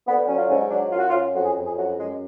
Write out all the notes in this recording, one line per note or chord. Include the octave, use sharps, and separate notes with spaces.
D3 B3
B3
F#3 C#4
F4
G#2 C#4
F#3 D4
F#2 F4
F#4
F4
F#2
F2 F#4
G#4
F2
G#4
F#2 F#4
F#2 G#3